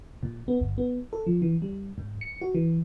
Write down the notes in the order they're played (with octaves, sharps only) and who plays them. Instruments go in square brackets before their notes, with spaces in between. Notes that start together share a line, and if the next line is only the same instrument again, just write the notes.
[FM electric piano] A#2
B3
G1
B3
A4
F3
E3
G3
G#2
C#7
F#4
E3